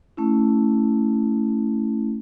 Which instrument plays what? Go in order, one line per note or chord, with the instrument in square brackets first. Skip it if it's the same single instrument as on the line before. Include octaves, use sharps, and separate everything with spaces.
[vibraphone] A3 C#4 E4